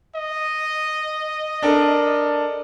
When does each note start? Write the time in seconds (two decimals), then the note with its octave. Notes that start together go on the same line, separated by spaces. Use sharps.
0.15 D#5
1.62 D4 A4 A#4